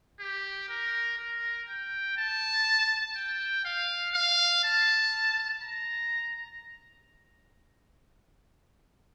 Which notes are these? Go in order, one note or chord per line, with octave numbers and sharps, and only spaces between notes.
G4
A#4
A#4
G5
A5
G5
F5
F5
A5
A#5